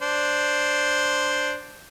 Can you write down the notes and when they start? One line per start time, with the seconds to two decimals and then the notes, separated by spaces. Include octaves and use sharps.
0.01 D4 C5